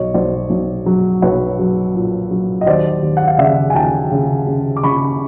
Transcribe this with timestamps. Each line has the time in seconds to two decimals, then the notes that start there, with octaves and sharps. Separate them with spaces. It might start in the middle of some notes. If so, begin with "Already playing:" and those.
Already playing: B1 C#5 D#5
0.14 B1 C5 D5
0.50 B1
0.86 F#3
1.22 B1 B4 C#5
1.59 F#3
1.94 A#2
2.31 F#3
2.61 D#5
2.66 D#2 C5 D5
3.02 D#2
3.17 F#5
3.27 F5
3.38 C#3 D5 E5
3.70 G#5
3.75 D#2 G5 A5
4.11 C#3
4.47 C#3
4.77 D6
4.83 C#3 B5 C#6